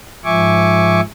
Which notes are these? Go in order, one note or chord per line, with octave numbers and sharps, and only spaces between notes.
G#2 F3 E5 G#5 C#6 D6